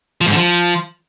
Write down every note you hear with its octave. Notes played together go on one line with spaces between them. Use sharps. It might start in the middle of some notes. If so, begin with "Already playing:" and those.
F3
G#2
D3
F3